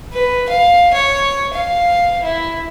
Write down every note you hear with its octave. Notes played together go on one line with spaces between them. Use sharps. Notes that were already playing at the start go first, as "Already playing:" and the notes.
B4
F5
C#5
F5
E4